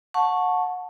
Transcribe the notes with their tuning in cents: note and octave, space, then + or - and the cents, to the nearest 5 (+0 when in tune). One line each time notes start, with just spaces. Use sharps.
F#5 -25 A5 +0 C#6 -5